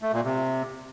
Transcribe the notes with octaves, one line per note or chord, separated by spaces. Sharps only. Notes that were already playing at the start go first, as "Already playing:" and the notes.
A3
A#2
C3